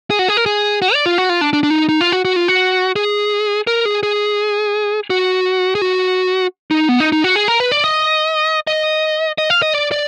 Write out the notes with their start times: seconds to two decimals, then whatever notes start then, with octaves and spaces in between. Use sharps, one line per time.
0.10 G#4
0.19 F#4
0.28 G#4
0.37 A#4
0.46 G#4
0.82 F#4
0.94 D5
1.06 F4
1.18 F#4
1.29 F4
1.41 D4
1.53 D4
1.63 D4
1.71 D#4
1.89 D#4
2.01 F4
2.12 F#4
2.25 F#4
2.36 F4
2.48 F#4
2.96 G#4
3.67 A#4
3.85 G#4
4.03 G#4
5.10 F#4
5.75 G#4
5.82 F#4
6.71 D#4
6.89 B3
7.00 D#4
7.12 D#4
7.24 F#4
7.36 G#4
7.48 A#4
7.60 B4
7.72 D5
7.84 D#5
8.67 D#5
9.38 D#5
9.50 F5
9.62 D#5
9.74 D5
9.92 D5